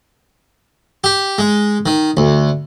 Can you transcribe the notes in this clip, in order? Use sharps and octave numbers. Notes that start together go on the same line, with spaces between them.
G4
G#3
D#3
D2